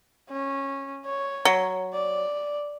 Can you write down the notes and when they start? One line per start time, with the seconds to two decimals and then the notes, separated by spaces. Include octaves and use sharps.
0.30 C#4
1.05 C#5
1.45 F#3
1.93 D5